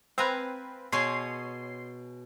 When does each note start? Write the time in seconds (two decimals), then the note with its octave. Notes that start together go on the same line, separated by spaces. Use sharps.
0.18 C4 B4 F5 G#5 A#5
0.92 B2 G#4 C#5 C6 C7